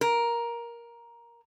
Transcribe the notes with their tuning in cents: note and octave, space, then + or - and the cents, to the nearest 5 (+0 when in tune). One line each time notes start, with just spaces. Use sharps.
A#4 +10